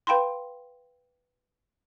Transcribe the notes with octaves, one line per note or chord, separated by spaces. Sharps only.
B4 F5 G5 B5 C6